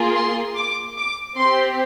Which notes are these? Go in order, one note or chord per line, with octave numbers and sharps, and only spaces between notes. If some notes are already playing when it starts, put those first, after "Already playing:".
Already playing: A#3 F4 G#4
C6
D6
D6
C4 G4 C6